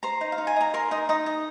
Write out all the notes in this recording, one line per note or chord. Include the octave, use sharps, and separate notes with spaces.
C5 A#5
D#4
F5
D#4
G#5
D#5 A#5
A#4 C6
D#4 D#6
D#4 D#6
D#5